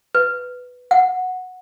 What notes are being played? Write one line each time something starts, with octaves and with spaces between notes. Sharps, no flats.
B4
F#5